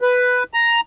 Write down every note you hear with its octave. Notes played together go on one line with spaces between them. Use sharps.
B4
A#5